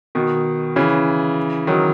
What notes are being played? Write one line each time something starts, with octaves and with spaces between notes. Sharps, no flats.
B2 D#3
C#3 E3
D#3 F#3